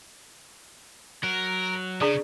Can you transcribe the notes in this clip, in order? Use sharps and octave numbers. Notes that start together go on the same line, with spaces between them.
F#3 A#4
C#3 D4 G#4 D5